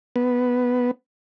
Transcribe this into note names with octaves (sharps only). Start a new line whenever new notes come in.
B3